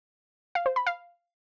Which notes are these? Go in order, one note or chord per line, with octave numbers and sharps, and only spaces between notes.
F5
C5
B5
F5